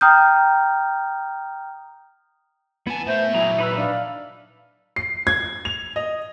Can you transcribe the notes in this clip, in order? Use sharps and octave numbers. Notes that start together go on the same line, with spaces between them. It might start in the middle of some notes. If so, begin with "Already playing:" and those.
G5 A#5 D#6 F6 G6
B3 E4 G#5 A5
A2 A3 C5 E5
A#2 F#3 E4 G#4 A#5
D#4 B4 B5 E6
D4 F5
C7
G#6
F7
D#5